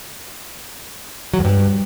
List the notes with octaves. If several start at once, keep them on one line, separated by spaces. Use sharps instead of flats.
F#3
E2
G2